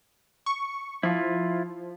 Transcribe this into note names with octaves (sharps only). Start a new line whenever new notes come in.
C#6
F3 E4 F4